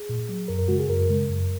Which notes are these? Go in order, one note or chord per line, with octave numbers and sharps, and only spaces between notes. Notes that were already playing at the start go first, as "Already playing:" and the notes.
Already playing: G#4
A#2
F#3
F#2 A#4
A#4
C#3 G#3 F#4
G#4
F#2 A#4
C#3 G#3
F#2